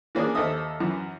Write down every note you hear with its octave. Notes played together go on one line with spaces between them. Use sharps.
E3 A#3 C#4 D4 G#4
D#2 A4 C5 D#5 E5 D#6
F#2 E3